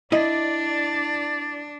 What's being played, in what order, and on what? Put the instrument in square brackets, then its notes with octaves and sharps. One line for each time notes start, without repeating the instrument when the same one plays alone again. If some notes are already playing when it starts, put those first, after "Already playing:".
[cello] D4 [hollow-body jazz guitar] E4 D#5 [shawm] D5